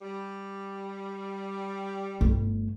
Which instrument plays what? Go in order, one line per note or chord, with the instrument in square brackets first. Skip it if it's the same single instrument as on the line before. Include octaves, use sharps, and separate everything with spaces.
[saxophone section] G3
[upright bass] G1 A3